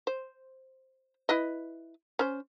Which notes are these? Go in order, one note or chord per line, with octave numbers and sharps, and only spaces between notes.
C5
E4 B4 D#5
C#4 C5